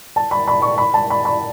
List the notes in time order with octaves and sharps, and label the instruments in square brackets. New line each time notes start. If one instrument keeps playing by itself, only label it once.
[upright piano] A5
B5
B5
C#6
B5
A5
B5
B5